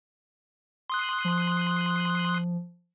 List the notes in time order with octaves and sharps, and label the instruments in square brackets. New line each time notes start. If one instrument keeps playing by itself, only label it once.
[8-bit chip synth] C6 D#6 F#6
[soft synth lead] F3